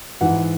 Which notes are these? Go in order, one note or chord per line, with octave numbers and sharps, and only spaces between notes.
G#2 E3 F#5